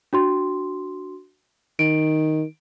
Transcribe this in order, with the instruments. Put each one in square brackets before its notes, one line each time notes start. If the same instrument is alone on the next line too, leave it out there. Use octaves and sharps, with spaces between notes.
[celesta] D4 F#4 C6
[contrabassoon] D#3 [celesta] D7